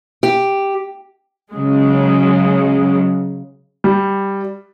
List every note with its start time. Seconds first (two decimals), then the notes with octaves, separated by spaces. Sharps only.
0.23 G4
1.52 C#3 F#3 G#3
3.84 G3